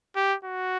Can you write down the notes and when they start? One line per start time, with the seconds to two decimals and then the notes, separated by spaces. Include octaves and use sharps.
0.16 G4
0.44 F#4